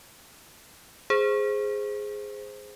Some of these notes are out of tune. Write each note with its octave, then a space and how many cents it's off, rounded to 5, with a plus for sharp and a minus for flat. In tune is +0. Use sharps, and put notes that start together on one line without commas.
G#4 +0 C5 +0